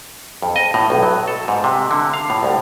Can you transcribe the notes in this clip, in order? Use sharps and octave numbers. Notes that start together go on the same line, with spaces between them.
F2
D#5
A2
B1
F#3
A4
G#2
C3
D3
F5
A2
C2